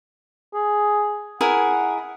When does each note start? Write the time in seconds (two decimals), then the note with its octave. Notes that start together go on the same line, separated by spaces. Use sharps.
0.54 G#4
1.41 E4 G#4 A#4 F#5